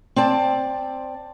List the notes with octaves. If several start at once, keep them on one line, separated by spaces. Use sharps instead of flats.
C4 D5 A5